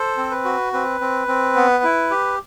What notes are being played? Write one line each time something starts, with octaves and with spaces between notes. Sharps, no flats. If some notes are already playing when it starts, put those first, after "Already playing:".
Already playing: A4 C5
C4
B4
F#4
C4 B4
C4
C4
B3
E4
G4